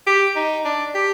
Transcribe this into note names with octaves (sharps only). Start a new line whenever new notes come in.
G4
D#4
D4
G4